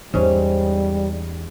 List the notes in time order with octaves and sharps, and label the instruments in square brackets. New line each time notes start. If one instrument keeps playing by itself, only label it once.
[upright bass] E2 [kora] G#2 C#4 [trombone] G3